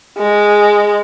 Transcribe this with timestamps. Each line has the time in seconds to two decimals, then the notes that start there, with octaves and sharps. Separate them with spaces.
0.18 G#3